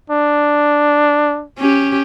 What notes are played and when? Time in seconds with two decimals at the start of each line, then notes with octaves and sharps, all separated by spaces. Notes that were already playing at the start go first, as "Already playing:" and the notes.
0.10 D4
1.58 C#4 G4